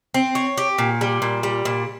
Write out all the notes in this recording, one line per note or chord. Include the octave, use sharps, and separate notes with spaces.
C4
C#5
G4
A#2
G3
A#2
G3
A#2